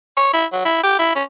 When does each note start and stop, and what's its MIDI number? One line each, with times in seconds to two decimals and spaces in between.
0.17 0.31 73
0.33 0.45 64
0.52 0.65 54
0.65 0.83 64
0.83 0.94 67
0.99 1.12 64
1.15 1.23 61